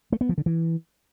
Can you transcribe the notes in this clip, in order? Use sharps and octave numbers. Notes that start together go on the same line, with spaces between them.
A3
B3
F3
D3
E3